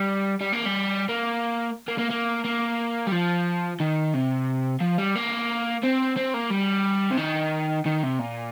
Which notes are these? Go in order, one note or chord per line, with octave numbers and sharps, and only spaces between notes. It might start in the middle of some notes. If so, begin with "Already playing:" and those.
Already playing: G3
G3
A#3
G3
A#3
A#3
A#3
A#3
A#3
G3
F3
D#3
C3
F3
G3
A#3
C4
C4
A#3
G3
C3
D#3
D#3
C3
A#2